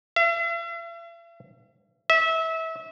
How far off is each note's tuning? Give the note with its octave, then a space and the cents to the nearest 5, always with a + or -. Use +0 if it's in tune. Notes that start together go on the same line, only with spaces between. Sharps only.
E5 +45
E5 -25